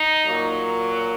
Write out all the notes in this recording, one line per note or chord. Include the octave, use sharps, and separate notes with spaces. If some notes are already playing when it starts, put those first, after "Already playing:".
Already playing: D#4
A#2 F#3 A#3